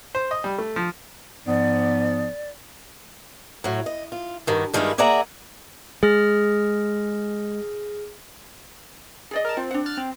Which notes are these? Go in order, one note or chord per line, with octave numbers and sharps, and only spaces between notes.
C5
D#5
G3
A3
F3
G#2 F3 B3 D5
A2 F#3
D#5
F4
G2 D#3 F#4
G2 D#3 G3 G#3 E4 F4
A#3 G#4 D5 E5 F#5 A#5
G#3 G#4 F6 A#6
G#4 D5 D#5
A#4 A5
C4 F4
D4 F#5
F6 F#6 A6
C4